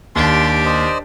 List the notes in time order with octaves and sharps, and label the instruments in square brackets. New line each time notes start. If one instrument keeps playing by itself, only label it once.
[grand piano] D#2 [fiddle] D4 G4 [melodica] C6
[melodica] C5 D5 D#5